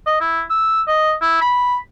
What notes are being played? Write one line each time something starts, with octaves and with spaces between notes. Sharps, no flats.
D#5
E4
E6
D#5
E4
B5